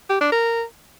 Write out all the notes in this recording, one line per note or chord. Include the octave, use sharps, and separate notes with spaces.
G4
D4
A#4